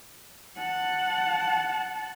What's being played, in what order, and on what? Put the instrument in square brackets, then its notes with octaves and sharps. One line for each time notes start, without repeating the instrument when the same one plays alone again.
[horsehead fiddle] F#5 A5